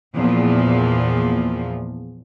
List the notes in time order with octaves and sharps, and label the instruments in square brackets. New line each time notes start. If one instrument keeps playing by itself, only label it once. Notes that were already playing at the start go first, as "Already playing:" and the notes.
[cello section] E2 A#2 F3